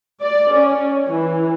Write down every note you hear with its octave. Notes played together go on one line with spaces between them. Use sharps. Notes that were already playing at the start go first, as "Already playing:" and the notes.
D5
C#4
E3